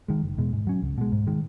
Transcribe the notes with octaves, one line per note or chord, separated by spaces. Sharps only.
D#3 G#3
F#1
E2 B2 G#3
G#2
F#3 C#4
C#2
B2 G#3
G#2
D#3 G#3